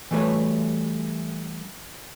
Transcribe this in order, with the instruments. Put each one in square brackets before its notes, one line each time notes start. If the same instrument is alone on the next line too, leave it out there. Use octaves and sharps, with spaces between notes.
[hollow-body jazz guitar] E3 G3 A3 F#4 B4 C#5